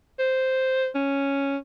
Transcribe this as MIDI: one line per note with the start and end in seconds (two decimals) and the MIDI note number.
0.19 0.88 72
0.95 1.57 61